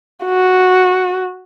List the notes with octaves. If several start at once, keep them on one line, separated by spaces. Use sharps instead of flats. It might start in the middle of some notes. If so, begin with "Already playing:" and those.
F#4